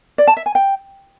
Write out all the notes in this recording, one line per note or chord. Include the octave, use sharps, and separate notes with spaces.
D5
A5
E5
G#5
G5